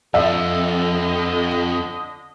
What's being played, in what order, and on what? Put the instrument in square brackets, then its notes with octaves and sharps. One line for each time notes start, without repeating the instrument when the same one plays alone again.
[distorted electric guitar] F2 [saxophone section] D3 D#5 [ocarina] A4 [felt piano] E5